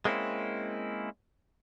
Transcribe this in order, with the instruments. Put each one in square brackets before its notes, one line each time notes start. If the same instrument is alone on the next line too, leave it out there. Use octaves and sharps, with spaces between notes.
[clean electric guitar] G#3 A#3 C4 C#4 E4